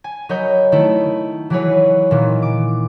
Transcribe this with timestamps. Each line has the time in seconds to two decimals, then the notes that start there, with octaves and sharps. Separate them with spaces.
0.04 G#5
0.29 F#3 A#4 C#5 D#5 B5 G6
0.72 D#3 A3 E4
1.50 E3 F#3 E4 G#4 B4 C#5
2.11 A#2 D#3 E3
2.42 D6